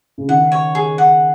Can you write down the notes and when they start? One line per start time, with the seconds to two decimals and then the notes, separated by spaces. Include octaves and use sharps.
0.18 C#3
0.28 D#3 F#5
0.52 C#5
0.75 G#4
0.98 F#5